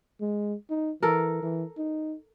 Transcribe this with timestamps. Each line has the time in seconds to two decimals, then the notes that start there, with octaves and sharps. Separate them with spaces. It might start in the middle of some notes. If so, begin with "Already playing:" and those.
0.21 G#3
0.70 D#4
1.03 E3 A4 A#4
1.43 E3
1.77 D#4